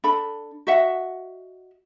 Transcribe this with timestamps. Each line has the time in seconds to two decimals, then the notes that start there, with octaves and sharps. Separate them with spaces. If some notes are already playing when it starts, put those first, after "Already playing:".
0.04 D4 A4 B5
0.67 F#4 D#5 E5 F#5